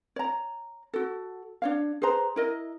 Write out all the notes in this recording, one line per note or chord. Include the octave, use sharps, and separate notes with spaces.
C#5 A#5
F#4 A4
D4 C#5 F5
G#4 B4 C5 A#5
E4 A#4 D#5